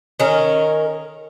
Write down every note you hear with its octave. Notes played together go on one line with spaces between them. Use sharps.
D#3 C#4 A#4